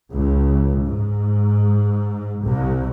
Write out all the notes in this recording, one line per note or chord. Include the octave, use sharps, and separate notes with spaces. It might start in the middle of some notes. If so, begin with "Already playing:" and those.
C#2
G#2
C2